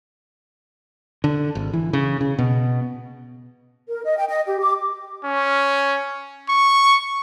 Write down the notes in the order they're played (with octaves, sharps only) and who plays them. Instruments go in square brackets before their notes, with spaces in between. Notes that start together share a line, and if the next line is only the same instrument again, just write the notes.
[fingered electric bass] D3
G#1
E3
C#3
C#3
B2
[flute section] A#4
D#5
G5
D#5
G4
D6
[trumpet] C#4
C#6